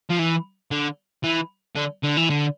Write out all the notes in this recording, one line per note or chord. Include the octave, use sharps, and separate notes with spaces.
F3
E3
D3
E3
D3
D3
E3
D3